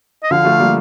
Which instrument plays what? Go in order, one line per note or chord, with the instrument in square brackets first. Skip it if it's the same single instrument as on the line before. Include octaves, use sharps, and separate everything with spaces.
[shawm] D#5
[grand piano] D3 F3 [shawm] F5
[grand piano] F3 A3
G3 A#3